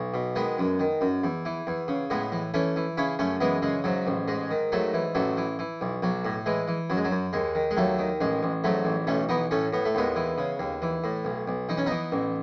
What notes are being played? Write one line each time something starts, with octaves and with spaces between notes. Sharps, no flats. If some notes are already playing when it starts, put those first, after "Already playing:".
Already playing: B1
B2
D#3 G#3 B3
F#2
D#3
F#2
E2
E3
E2
C#3
A2 G#3 B3
E3
E3 A3 C#4
E3
C#3 C#4 E4
F#2 A3 C#4
E3 G#3 B3
C#3 G#3
G#2 F#3
A1
G#2 G#3
D#3
G#2 F#3 A3
E3
A1 F#3 A3
E3
E3
B1
B1 F#3
A2
E3 G#3
E3
F#2 F#3
G#3
F#3
F#2
D#2 G#3
D#3
G#3
D#2 F#3 A3
D#3
A1 G#3
A1
G#2 F#3 A3
A1
B1 A3 C#4
E3 B3 D#4
A2 A3 C#4
A2 B3
A3
D#2 G#3 B3
E3
C#3
D#2
E3
A2
B1
B1
E3 D#4
C#4
E3 B3 D#4
A1